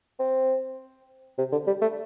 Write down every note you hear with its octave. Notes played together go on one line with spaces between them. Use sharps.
C4
C3
D3
G3
A3